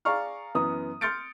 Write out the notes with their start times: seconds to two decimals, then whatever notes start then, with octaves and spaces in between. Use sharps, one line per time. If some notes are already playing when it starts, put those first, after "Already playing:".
0.05 G#4 D5 F5 A#5 C#6 F6
0.55 F#2 E3 B3 A#5 D#6
1.01 C6 F6 G6 A6 C#7 D7